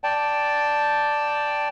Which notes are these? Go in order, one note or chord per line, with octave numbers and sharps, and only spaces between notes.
D5 G5 A5